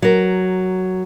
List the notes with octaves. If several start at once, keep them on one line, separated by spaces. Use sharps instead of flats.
F#3 A#4